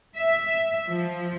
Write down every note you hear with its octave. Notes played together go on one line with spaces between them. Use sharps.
E5
F3